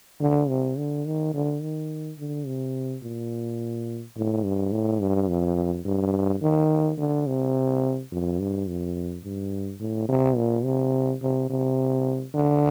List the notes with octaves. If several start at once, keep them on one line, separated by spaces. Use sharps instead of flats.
D3
C3
D3
D#3
D3
D#3
D3
C3
A#2
A2
G2
A2
G2
F2
G2
D#3
D3
C3
F2
G2
F2
G2
A2
C3
A#2
C3
C3
C3
D3